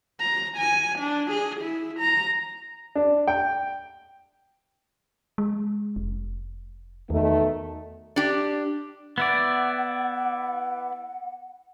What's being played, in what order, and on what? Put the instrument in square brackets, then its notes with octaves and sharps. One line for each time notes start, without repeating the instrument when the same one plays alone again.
[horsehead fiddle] A#5
G#5
D4
G#4
E4
A#5
[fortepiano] D4
G5
[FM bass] G#3
F1
[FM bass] E2 [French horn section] B2 D#3 A3
[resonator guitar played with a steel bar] D4 G4
[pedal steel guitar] B3 E4 D5 [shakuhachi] F#5